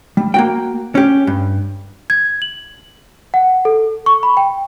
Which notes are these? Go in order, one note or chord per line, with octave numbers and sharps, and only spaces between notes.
G3
A#3 F#4 G5
C#4 G4
G2
G#6
F#7
F#5
A4
C#6
B5
G5